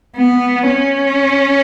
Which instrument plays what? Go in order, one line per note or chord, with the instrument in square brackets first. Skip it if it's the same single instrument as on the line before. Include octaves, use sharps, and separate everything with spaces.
[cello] B3
C#4